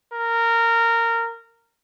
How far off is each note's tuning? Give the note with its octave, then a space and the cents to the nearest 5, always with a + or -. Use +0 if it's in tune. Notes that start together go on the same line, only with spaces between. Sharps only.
A#4 -15